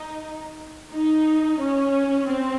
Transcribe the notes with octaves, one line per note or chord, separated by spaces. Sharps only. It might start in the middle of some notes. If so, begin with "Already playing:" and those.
Already playing: D#4
D#4
C#4
C4